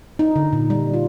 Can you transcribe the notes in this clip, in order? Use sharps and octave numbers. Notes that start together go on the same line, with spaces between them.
D#4
D3
A#2
G3
F4